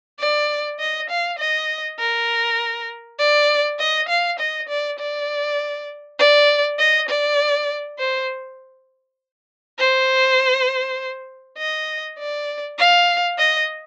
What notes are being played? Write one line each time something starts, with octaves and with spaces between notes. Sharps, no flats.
D5
D#5
F5
D#5
A#4
D5
D#5
F5
D#5
D5
D5
D5
D#5
D5
C5
C5
D#5
D5
F5
D#5